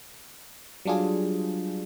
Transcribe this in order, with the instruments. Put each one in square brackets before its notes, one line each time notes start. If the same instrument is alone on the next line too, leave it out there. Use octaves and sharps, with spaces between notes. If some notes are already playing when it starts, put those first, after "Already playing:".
[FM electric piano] F#3 G3 D4 F4 G#4